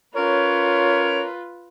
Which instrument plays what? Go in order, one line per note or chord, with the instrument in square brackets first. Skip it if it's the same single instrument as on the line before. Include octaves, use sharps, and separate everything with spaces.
[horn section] C#4 A#4 C#5 [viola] F4 B4